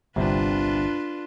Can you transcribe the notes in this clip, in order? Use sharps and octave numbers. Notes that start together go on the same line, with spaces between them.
G1 C2 C3 D4 F4 B4